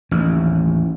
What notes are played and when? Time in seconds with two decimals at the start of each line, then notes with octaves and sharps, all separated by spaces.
0.11 A1 D#2